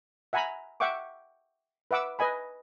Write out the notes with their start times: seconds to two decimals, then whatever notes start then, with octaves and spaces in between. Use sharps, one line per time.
0.33 E5 F#5 G#5 A#5 B5
0.80 E5 F#5 G5 C#6 D6
1.91 B4 E5 F#5 D6 E6
2.19 B4 D#5 G#5 B5